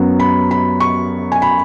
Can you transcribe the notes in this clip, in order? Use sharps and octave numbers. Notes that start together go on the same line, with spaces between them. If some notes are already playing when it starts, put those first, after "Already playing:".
Already playing: F#2 F#3 B3
B5
B5
C#6
G#5
B5